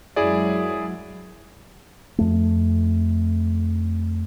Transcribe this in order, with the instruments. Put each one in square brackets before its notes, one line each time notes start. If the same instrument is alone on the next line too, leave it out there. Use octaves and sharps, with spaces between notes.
[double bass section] F#2 F#3 G#3 [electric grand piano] E4 G#4 D5
[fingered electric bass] F2 A3